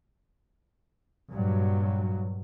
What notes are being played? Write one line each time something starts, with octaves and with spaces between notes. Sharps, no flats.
G2 A#2 F#3